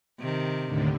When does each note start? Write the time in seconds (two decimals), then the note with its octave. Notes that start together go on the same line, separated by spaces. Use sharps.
0.20 C3 D#3
0.65 D#2 A2 D3